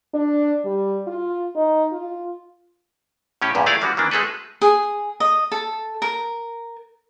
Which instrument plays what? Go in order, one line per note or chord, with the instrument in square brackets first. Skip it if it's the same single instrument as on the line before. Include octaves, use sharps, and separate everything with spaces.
[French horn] D4
G3
F4
D#4
F4
[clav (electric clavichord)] A2 C#4 G4
E2 G2 A#2
A3 E4 G#4 D5 F5
E3 G3 G#3 C#4 F#4
D#3 E3 A#3 D4
G#3 A3 G#4 A4 B4
[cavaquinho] G#4
D#5
A4
A#4